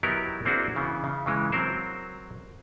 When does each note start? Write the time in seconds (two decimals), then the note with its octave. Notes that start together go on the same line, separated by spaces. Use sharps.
0.03 F#3 B3 D#4 E4 G4 A#4
0.45 A#3 C4 D4 E4 F#4 G#4
0.76 C#3 E3 B3
1.04 C#3
1.26 C#3 E3 G#3
1.52 F#3 C4 A#4 C5